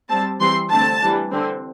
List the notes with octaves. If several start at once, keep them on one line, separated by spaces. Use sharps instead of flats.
G3 C4 A5
E3 G3 C4 C6
D3 A3 C4 A5
E3 G3 D4
D3 C4